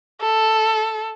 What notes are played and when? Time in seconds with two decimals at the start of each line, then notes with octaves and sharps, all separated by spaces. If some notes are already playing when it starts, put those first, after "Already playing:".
0.22 A4